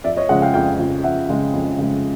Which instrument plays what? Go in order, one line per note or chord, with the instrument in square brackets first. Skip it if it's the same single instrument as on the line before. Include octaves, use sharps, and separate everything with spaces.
[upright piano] F2 D5 E5
C#5 D#5
C#3 F3 G#3 E5 F#5
F5 G5
F2 F5 G5
C#3 F3 G#3
F2 E5 F#5
C#3 F3 G#3
F2
C#3 F3 G#3